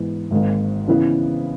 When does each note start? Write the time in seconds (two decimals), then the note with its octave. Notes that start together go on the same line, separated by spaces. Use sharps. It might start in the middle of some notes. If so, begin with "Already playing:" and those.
Already playing: G#2 E3 B3
0.31 G#1 G#2 D#3 A#3
0.88 C#3 E3 B3 E4 B4